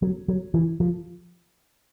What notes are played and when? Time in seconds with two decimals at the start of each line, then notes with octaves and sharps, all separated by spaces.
0.02 F#3
0.28 F#3
0.54 E3
0.80 F3